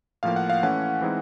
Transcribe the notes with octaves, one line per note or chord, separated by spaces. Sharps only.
A2 F3 A#3 F5
F#5
F5
E3 A3 C#4 F#5
E3 G#3 C4 D#4